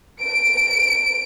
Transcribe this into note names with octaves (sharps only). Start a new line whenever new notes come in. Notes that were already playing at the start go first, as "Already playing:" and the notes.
D7